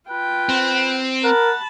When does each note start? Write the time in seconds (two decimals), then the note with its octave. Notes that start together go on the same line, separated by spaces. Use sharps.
0.10 F4 B4 G5
0.49 C4
1.24 A#4 F#5 A5 B5